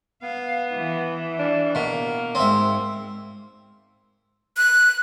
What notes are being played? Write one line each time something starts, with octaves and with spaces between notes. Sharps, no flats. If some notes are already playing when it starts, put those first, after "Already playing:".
B3 F5
E3
D4
B2 A#3
G#2 G#3 C4 E5
F#6